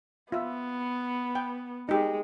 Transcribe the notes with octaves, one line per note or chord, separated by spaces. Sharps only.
B3 F4 E5
G5
G#3 D#4 G4